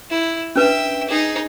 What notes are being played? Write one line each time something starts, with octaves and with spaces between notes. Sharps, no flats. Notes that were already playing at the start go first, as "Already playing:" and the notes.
E4
C#4 D4 B4 E5 G5
D#4 G#4